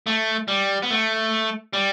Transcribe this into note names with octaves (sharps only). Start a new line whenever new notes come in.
A3
G3
B3
A3
G3